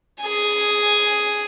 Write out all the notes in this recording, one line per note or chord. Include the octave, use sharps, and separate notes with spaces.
G#4 G#5